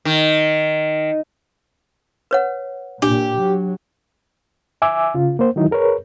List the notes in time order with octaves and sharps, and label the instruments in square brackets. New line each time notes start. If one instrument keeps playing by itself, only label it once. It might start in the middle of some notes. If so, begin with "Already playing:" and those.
[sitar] D#3
[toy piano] B4 C#5 F#5
[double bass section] A#2 [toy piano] D4 [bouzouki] G4
[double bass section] F#3
[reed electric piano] E5 G#5 D6 E6
C#3 F4
A#3 C5
D#3 E3 F#3 D#4 E4
G#4 A#4 B4 C#5